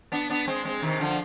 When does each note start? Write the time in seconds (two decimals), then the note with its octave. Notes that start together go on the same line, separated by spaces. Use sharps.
0.12 B3 D4
0.30 B3 D4
0.47 G#3 C4
0.65 G#3 C4
0.82 C3 D#3
1.00 D3 F3